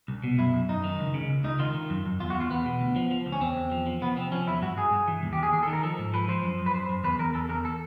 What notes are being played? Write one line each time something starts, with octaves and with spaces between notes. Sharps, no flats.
C2
B2
F#2 E4
F#2
F#2 D#4
D#3
C#2
C#3
C#2
C#2 D#4
D#3 F4
D#3
F#2
F#2
E2 F4
F#4
E2
F4
E2 B3
B2
D2
F3
F3
D2
C#4
E2 C4
E2
F3
F3
C3 B3
F3 C4
F3 C#4
E2 E4
G2 F#4
G2 G#4
G2
E3
D#2
G4
D#2 G#4
D#2 G#4
A4
D#3
A#4
F3 A4
G#2
F3 B4
F3 C5
F#2
F#2
B4
F#2 C5
F#2
E2 B4
E2 A#4
E2 A4
E2 A#4
A4